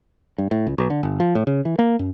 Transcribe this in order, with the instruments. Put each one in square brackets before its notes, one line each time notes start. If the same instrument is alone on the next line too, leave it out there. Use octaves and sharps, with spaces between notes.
[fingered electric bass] G2
A2
C#2
B1
D3
G1
F3
A2
C#3
E3
A#3
F#2